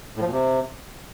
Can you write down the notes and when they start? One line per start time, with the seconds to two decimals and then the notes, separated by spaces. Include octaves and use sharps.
0.16 A2
0.21 F3
0.27 A#2
0.32 C3